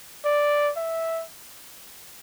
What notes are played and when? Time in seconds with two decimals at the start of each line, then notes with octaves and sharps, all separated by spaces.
0.25 D5
0.77 E5